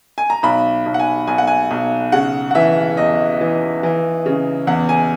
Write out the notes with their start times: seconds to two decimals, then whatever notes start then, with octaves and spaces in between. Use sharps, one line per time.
0.18 G#5
0.30 A#5
0.43 B1 B5
0.86 B1
0.94 F#5
1.00 G#5
1.27 B1 G#5
1.38 F#5
1.47 G#5
1.71 B1
2.12 C#3 F#5
2.51 F#5
2.55 E3 E5
2.97 E2 D#5
3.41 E3
3.83 E3
4.26 C#3
4.67 E2 F#5
4.89 G#5